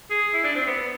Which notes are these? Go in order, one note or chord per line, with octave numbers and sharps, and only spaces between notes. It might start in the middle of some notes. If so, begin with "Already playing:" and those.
G#4
E4
D4
C4
B3
B3